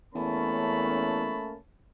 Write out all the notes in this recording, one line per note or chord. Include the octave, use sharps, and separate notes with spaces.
E2 A3 A#3 C#4 C#5 A5 B5